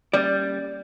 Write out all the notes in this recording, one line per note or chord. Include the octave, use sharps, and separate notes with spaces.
G3 A#3 C#4 D5 A6